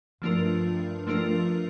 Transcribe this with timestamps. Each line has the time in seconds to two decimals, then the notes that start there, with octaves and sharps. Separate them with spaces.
0.22 G2 F3 A3 D4 F4 A#4
1.07 F3 A3 D4 F4 A#4